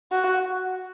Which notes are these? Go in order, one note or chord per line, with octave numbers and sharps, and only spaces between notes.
F#4